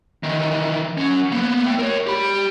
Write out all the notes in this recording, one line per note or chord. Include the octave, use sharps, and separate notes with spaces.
D#3 E3
F#3 C#4
A#3 B3
A3 G5
A#4 C#5
G4 B5